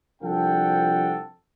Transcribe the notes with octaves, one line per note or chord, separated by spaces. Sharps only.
C2 F3 D4 A4 F#5 G5